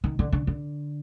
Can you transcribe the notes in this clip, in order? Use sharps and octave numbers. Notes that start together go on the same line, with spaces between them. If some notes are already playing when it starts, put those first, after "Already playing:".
D#3
D3
D3
D3